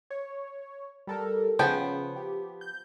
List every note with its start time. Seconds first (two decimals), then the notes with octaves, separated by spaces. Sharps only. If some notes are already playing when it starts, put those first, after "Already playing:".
0.10 C#5
1.07 G3 A4 A#4
1.59 C#3 F3 B3 G5
2.16 G4
2.61 G6